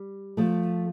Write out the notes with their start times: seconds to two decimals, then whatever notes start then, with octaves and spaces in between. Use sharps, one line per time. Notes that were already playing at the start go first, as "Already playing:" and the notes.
Already playing: G3
0.37 F3 A3